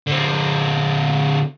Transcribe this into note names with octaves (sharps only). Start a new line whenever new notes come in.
D3 C4